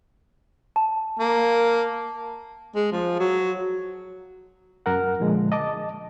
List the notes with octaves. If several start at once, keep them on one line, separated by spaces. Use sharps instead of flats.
A5
A#3
G#3
F3
F#3
F#2 A#4 F#5
A#2 D3 F3 G#3
D#5 A5 D6